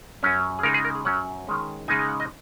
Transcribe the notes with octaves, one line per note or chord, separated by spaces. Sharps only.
F#2 F#3 C#4
G#4
C#3 G#3 D#4 A#4
G#4
A#4
G#4
F#2 F#3 C#4 F#5
D#3 G#3 C#4
C#3 G#3 D#4 G#5
G#5
F#5
D#5